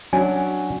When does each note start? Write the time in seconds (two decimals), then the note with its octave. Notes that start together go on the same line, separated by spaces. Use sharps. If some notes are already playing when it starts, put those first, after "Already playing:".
0.13 F#3 C#4 D4 G#5